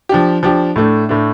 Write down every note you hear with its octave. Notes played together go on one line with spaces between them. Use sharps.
F3 D4 G4
F3 D4 G4
A2 A3 D4
A2 A3 D4